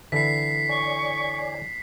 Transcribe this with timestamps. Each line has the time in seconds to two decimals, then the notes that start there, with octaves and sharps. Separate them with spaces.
0.12 D3 E3 E4 B6 C7
0.69 C#5 D5 G#5 C#6